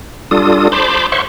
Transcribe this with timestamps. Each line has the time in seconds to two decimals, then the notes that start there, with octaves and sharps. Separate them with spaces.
0.31 G3 D4 F4 A4 D#6
0.72 C5 A5 B5 C6 D6
1.12 C5 C#5 E5 F#5 C6 C#6